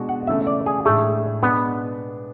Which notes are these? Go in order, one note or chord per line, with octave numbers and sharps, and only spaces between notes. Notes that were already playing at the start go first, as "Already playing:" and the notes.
Already playing: B2 G#3 D4 F#4
F#5
C#3 E3 A3 E5
D5
G#4
A2 G#3 A3 D4 G#4
B2 G#3 B3 D4